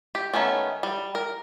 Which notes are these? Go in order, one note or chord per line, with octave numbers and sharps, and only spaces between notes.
G4
D#3 A3 B3 C#4
G3
A#4